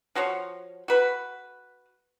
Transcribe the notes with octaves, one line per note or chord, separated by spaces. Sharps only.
F3 F#4 C5 C#5
F#4 B4